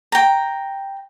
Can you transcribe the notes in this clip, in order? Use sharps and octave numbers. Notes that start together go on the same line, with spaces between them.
G5 A#5